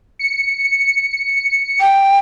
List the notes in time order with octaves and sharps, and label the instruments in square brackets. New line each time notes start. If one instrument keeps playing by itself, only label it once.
[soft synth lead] C#7
[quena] G5